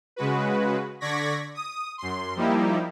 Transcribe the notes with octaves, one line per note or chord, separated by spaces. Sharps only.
C#3 G#3 F#4 B4
D3 D5 C#6 G#6 A#6 B6
D#6
F#2 C6
F3 G3 A#3 D#4 E4 G4